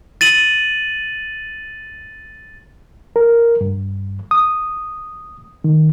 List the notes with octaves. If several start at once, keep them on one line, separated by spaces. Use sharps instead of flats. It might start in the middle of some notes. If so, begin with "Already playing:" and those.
A6 D#7 F#7
A#4
G2
D#6
D#3